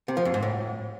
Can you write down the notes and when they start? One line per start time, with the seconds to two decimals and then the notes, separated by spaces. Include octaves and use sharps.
0.08 C3
0.17 F3
0.25 F2
0.34 G#2
0.42 A2